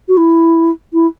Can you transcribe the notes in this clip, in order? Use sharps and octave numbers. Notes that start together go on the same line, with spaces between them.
F#4
E4
E4